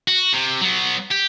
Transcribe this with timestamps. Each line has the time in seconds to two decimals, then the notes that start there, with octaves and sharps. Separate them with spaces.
0.08 F#4
0.33 C3
0.61 F#3 B3
1.11 G4